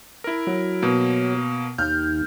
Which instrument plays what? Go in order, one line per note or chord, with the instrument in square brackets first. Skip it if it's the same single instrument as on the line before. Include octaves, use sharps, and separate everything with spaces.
[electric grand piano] E4 A#4
[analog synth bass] F#3
[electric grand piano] B2 A#3
[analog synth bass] D#2 [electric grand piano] F6 G6